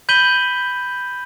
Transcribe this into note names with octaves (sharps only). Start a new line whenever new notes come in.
B5 G6 B6 D#7 F#7 G7